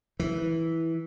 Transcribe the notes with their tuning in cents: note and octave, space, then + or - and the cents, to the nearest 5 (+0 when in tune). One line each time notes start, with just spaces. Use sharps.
E3 -10